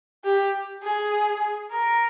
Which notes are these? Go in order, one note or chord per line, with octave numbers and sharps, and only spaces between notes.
G4
G#4
A#4